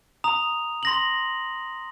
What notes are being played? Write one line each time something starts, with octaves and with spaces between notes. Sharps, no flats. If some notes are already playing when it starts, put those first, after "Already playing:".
A#5 D#6 F7
C6 A#6 F#7